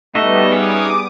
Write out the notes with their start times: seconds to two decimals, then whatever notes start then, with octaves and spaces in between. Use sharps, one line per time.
0.15 G3 A3 B3 D#4 F#4 D#5 E5
0.51 C#4 G#4 D6 D#6